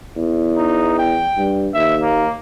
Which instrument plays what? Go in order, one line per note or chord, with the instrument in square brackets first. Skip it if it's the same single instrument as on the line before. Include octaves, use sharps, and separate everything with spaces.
[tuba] E2
[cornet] D#4
G5
[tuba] G2
[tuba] D#2 [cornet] E5
[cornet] A#3